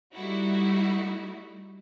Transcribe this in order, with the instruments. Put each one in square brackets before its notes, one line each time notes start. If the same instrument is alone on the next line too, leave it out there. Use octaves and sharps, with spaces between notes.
[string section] G3 A3 D#4 E4 F#4